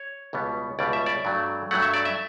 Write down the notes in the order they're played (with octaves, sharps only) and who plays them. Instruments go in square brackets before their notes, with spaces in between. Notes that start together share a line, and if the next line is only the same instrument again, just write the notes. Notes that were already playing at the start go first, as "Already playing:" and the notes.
Already playing: [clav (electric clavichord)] C#5
C#2 B2 G3 B3
C#2 B2 G3 B3 D5
E5
D5
G2 F#3 A3
G2 F#3 A3 F#5
E5
D5
E5